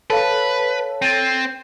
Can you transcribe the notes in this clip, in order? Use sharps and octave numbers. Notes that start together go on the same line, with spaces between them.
A4 B4 C#5 F5 A5
C4 A6 D#7